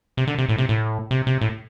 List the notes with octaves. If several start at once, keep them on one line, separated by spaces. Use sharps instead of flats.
C3
D3
C3
A2
C3
A2
C3
C3
A2